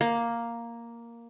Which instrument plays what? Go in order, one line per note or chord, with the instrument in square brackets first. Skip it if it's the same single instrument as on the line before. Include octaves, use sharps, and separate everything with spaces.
[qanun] A#3